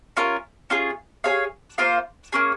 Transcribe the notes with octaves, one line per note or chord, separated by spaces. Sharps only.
C#4 F4 A#4
C#4 F4 G#4
G#4 C#5 F5
A#3 F4 C5 F5
A#3 C#4 G#4